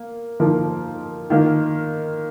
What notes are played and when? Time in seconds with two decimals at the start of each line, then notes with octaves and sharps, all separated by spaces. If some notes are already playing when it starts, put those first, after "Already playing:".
Already playing: A#3
0.40 F3 A#3 D#4 A#4
1.30 D#3 A#3 F4